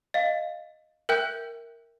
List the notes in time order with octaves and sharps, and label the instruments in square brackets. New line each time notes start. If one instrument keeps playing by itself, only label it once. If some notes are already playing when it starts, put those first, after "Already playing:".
[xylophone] D#5 F5
A#4 E5 G5 F#6 G6